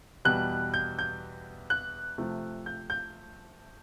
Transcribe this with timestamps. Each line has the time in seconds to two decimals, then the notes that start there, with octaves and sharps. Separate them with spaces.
0.25 E2 B2 G3 F#6
0.74 G6
0.99 G6
1.70 F#6
2.18 C3 F3 A3
2.66 G6
2.90 G6